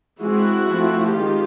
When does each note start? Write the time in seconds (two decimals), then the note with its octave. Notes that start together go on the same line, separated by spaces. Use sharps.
0.22 E3 G#3 C4 E4 F#4
0.68 F3 A3 C4
1.14 D#3 G#3 F4 G4